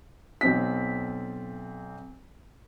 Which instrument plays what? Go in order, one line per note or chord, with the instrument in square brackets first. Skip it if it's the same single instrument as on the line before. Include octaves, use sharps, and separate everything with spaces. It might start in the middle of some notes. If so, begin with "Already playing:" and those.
[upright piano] B1 C4 B6